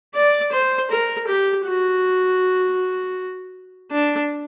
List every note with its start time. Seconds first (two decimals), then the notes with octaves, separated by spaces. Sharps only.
0.15 D5
0.52 C5
0.91 A#4
1.27 G4
1.66 F#4
3.91 D4